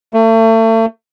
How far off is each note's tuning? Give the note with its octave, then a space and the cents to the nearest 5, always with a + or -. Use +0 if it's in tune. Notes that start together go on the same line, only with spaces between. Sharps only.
A3 +35